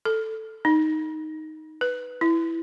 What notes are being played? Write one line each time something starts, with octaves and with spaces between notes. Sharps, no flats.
A4
D#4
B4
E4